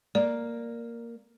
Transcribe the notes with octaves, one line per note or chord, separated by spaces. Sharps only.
A#3 D5